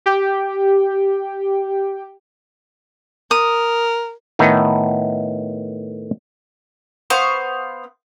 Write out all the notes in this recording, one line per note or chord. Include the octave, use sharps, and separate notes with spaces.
G4 G5
A#4 D#6
A2 D#3 A3 B3
B3 C5 F5 C#6